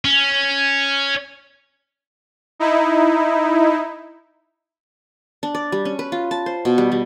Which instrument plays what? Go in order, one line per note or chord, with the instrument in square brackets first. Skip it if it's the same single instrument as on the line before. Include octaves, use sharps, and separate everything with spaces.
[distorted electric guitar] C#4
[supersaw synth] D#4 E4
[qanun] D4
D5
G3
C#4
B4
F4
A5
C5
B2
G3
G3